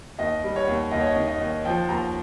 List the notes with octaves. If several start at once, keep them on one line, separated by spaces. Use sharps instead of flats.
D#2 D#5
G3
C#5
D#2
D#2 D#5
C#5
D#5
D#3
D#5
D#2
F3 G5
D#2 A#5